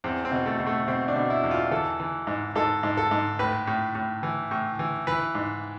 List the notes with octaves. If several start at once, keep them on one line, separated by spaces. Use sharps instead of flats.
E2 C4
C4
B2
A3
B2
A3
B2 C4
D4
B2
E4
E2
F4
E3 A4
E3
G#2
G#2 A4
G#2
A4
G#2
A2 B4
A2
A2
E3
A2
E3
E3 B4
G#2